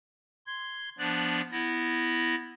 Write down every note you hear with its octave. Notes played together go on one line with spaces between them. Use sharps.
C6 G#6
F3 B3 D4 D5 F#6
B3 E4 A#6